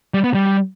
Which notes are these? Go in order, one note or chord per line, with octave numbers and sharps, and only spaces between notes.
G3
B3
G3